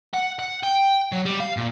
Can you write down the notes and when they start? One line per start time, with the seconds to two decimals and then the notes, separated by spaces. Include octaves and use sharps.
0.14 F#5
0.39 F#5
0.63 G5
1.12 F#3
1.25 G3
1.40 F5
1.57 A#2